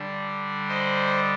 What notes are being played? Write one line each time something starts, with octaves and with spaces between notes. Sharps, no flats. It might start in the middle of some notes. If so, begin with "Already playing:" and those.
Already playing: D3 G3 D4
C5 D#5